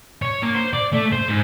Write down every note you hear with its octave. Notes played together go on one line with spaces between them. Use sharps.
C#5
A#3
C5
D5
A3
C5
G#2